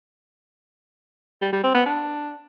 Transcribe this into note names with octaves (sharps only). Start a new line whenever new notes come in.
G3
G3
C4
B3
D4